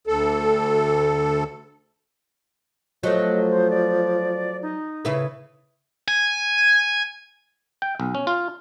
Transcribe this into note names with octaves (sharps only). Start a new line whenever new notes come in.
D2 A4
F3 F#3 A3 D#5
C5
D5
D#4
C#3 E4 B4
G#5
G5
B1
C#4
F4